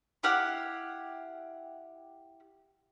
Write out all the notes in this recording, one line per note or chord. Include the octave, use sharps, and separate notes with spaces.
E4 G4 F5 F#5